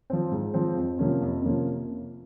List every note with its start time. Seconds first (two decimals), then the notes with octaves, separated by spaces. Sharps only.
0.10 F3 C4
0.31 G#2
0.54 F3 C4
0.77 F2
0.99 C3 F3 A#3 C#4
1.22 F2
1.44 C3 F3 A#3 C#4